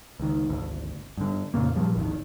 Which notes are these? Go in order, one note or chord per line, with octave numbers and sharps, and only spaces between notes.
C#2 D#3
G#1 D2
G2 D3
F2 A#2 C#3 A#3
A#2 F3 G3
G#1 D2 D#3